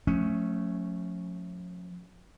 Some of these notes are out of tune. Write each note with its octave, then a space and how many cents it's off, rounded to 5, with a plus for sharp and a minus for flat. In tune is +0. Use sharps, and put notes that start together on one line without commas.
F3 +45 A3 +0 C#4 +0